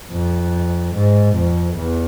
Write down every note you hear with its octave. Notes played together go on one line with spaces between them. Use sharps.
F2
G#2
F2
E2